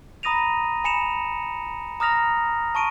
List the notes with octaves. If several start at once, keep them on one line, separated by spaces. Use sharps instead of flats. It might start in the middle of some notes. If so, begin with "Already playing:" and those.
A#5 B5 D#6 A#6 D#7 F7
G#5 B5 C#7 E7 F7
A#5 D#6 F6 A#6 F7
A5 C#6 D7 D#7